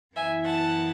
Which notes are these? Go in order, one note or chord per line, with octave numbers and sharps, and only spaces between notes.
F#2 E3 B3 E4 E5 G#5
F#5 A5